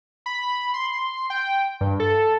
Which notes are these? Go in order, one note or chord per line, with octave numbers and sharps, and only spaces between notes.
B5
C6
G5
G2
A4